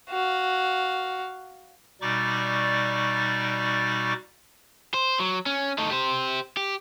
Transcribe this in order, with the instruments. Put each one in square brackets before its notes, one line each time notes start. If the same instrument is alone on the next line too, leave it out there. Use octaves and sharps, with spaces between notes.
[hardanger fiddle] F#4 F5
[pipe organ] B2 G3 D#4 D5 C#6 D6
[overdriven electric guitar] C5
F#3
C#4
A3 D#4
G4 C5
G4